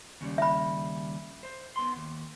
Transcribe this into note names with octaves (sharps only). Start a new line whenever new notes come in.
D#2 C#3 G3
E5 B5
C5
B3 C6
D#2